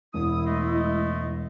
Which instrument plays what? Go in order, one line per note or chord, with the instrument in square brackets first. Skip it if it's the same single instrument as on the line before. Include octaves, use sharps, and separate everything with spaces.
[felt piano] E1 [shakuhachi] E4 [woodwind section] D#6
[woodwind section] G#3 A3 D#5